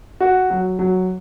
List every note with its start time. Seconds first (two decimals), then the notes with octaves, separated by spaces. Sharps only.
0.20 F#4
0.50 F#3
0.79 F#3